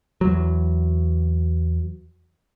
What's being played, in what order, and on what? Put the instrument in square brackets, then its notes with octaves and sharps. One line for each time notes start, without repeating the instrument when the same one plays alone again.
[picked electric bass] E2 F#3